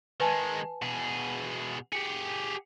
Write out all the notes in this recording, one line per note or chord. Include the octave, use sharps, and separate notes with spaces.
D#3 G#3 B4 G#5 A5
B2 G#4
G4 G#4 C#7